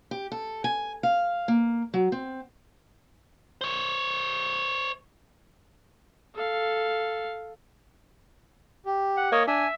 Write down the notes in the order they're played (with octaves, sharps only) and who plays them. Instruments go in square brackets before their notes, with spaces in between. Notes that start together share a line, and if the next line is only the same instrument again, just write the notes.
[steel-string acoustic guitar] G4
A4
G#5
F5
A#3
F#3
C4
[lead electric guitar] C5 C#5
[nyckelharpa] A4 F5
[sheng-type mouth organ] G4
[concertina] F#5
[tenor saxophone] A#3 [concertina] C#5 D#5
[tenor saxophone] D4 [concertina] E5 [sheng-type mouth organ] G#5